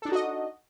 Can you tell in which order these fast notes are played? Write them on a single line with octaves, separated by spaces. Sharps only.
A4 D4 D#4 F#4 D#5